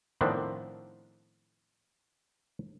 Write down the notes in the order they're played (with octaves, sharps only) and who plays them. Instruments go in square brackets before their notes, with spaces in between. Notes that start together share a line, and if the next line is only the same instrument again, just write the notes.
[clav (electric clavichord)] A2 D#3 F3 B3 C4 D4